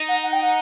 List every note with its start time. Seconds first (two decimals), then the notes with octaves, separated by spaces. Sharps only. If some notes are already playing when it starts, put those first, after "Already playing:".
Already playing: D#4
0.08 F#5
0.23 F#5
0.32 G5
0.42 F#5